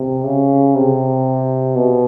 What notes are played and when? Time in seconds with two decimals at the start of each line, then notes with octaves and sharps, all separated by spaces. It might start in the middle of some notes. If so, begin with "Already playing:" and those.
Already playing: C3
0.24 C#3
0.75 C3
1.75 B2